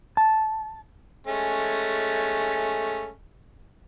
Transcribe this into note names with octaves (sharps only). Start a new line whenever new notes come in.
A5
G#3 A3 C#4